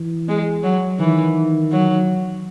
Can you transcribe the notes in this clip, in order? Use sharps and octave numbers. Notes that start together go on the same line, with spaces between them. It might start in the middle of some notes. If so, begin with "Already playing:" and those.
Already playing: E3
G#3
F#3
D#3 E3
F#3